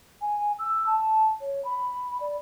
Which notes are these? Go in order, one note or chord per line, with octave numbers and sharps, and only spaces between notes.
G#5
E6
A5
C#5
B5
D5